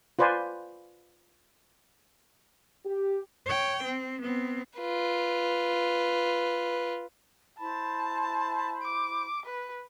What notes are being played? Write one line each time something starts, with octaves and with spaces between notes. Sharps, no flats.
F4 B4 C5 D5 G#5
G4
C#5 G5
C4
B3 C4
F4 B4
E4 C5 A5 B5
D6
B4